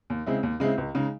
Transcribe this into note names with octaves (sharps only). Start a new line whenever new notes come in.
D#2
C#3 G#3 C4 E4
D#2
C#3 G#3 C4 E4
C#2
C#3 G#3 D#4